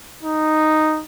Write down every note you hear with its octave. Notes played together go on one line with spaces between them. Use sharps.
D#4